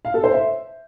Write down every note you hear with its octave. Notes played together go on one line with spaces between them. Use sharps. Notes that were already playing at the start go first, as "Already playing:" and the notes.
F5
A4
C5
E5